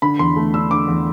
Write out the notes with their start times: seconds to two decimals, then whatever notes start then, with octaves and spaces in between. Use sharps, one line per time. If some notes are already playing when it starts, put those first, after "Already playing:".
0.02 D3 B5
0.19 E2 C6
0.36 A3
0.53 D4 E6
0.71 D3 D6
0.88 E2